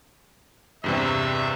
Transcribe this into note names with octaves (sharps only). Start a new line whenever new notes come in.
E2 G2 C3 E5